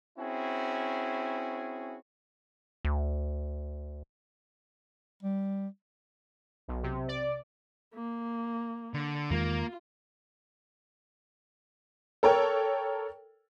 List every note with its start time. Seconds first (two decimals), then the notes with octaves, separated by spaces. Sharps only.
0.18 C4 C#4 E4 F#4 G#4
2.85 D2
5.23 G3
6.68 B1
6.83 C3
7.08 D5
7.94 A#3
8.94 D3
9.31 E2 D#3 G#3 A#3 F4
12.23 A4 A#4 C#5 G5